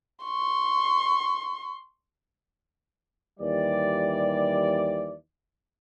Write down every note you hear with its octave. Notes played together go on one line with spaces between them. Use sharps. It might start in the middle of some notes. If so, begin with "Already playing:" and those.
C6 C#6
D#2 E3 G3 D5